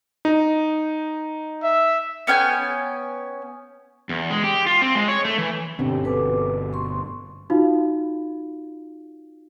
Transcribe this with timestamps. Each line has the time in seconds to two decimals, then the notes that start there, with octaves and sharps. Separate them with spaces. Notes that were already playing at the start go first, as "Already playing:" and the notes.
0.25 D#4
1.62 E5
2.27 B3 C#4 G5 G#5
4.09 E2
4.30 G#3
4.44 G4
4.66 F4
4.82 C4
4.95 G#3
5.08 C#5
5.25 A3
5.38 E3
5.79 G2 B2 D3 C4 C#4 G4
6.04 G1 B2 A4 B4 D6
6.73 C6 C#6
7.50 D#4 F4 F#4 F5